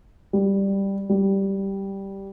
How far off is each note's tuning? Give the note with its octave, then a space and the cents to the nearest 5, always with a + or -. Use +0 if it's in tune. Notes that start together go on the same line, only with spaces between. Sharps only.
G3 +5
G3 -5